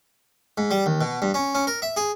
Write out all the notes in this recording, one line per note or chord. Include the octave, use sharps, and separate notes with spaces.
G#2
G3
D#2
B2
G2
C#4
C#4
A#4
E5
G#4